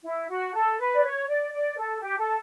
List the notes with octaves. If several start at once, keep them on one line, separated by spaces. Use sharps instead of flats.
E4
F#4
A4
B4
D5
C#5
D5
D5
A4
G4
A4